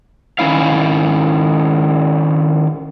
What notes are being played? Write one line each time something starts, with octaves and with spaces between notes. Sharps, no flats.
D#3 C#4 E4 F5